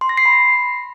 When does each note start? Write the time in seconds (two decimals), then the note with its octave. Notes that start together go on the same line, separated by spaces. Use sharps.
0.01 C6
0.09 A#6
0.17 C7
0.26 B5